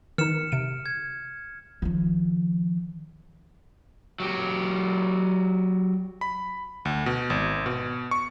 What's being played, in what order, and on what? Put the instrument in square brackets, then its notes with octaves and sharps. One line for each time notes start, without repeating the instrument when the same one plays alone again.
[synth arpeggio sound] D#3 E3 D#4 [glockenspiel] F6 C#7 E7
[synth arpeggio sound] C3 D7
[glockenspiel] G#6
[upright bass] D#3 F3
[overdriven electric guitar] F#3 G4
[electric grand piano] B5
D2
B2
G#1
B2
C#6